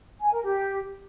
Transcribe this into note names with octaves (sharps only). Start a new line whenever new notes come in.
G#5
A#4
G4